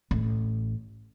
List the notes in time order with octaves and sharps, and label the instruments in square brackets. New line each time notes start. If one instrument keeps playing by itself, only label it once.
[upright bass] A1